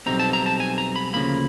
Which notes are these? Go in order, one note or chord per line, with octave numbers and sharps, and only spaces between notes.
B1 B2 G3 C4 D#4 A#5
A5
A#5
A5
G#5
A#5
B5
D2 C#3 F3 A#3 B5